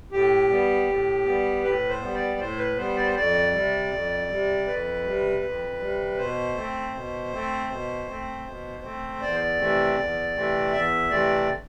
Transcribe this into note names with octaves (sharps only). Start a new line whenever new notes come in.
A2 G4
G3 B3
A2
G3 B3
A2 B4
C5
G3 B3
D5
A2 C5
B4
G3 B3 C5
D5
C5
F2 D5
C3 G3
F2
C3 G3
F2 B4
C3 G3
F2
C3 G3
B2 C5
A3 C4
B2
A3 C4
B2
A3 C4
B2
A3 C4
E2 D5
C3 E3 A3 C4
E2
C3 E3 A3 C4
E2 E5
C3 E3 A3 C4 D5